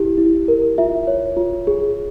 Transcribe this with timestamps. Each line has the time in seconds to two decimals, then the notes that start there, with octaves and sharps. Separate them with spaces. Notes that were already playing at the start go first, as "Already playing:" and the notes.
Already playing: E4 G4
0.18 E4
0.48 A#4
0.78 F4 E5
1.07 C#5
1.37 F4
1.67 G#4